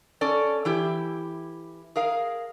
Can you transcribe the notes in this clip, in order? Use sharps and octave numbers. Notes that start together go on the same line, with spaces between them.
C#4 A4 D5
E3 E4 G4
G#4 A#4 F5